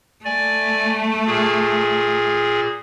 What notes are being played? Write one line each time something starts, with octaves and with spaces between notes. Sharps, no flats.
A3 D5 G#5
A#2 G#4